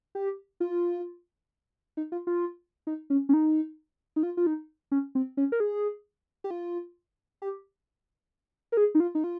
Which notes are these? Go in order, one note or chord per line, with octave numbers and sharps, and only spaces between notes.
G4
F4
D#4
F4
F4
D#4
C#4
C#4
D#4
D#4
F4
F4
D#4
C#4
C4
C#4
A#4
G#4
G4
F4
G4
A#4
G#4
D#4
F4
D#4
F4